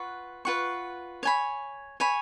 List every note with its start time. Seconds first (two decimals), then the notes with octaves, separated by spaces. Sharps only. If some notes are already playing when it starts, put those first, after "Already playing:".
Already playing: F4 B4 F#5 C#6
0.45 F4 B4 F#5 C#6
1.23 C#5 G#5 B5
2.00 C#5 G#5 B5